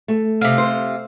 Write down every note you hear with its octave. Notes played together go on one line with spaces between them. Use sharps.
A3
C3 F4
C5